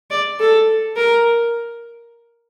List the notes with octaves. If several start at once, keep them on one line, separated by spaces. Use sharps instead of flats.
D5
A4
A#4